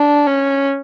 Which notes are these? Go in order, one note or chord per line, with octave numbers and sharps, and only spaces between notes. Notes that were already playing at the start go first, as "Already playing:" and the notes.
Already playing: D4
C#4